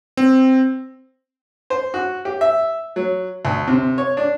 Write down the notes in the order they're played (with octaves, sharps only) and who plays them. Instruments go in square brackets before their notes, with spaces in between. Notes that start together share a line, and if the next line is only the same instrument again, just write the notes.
[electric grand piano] C4
[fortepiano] C5
F#4
G4
E5
F#3
D2
C3
C#5
D4